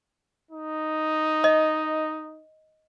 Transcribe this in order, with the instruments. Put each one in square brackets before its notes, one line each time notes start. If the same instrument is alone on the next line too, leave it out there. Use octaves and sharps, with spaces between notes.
[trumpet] D#4
[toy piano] D#5